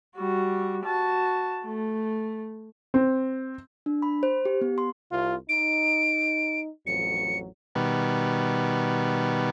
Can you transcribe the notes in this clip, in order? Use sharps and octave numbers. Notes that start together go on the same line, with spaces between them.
G3 F#4
F#4 A5
A3
C4
D4
B5
C5
G4
B3
C6
C2 C3 F4
D#4 D7
A1 F2 F#3 C#7
B2 D#3 G3 B3